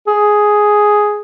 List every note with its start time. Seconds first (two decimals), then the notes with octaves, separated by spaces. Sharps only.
0.07 G#4